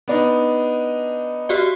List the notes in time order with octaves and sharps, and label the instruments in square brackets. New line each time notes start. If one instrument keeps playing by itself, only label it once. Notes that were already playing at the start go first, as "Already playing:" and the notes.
[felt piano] B3 D4 D#4
[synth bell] F#4 G4 D5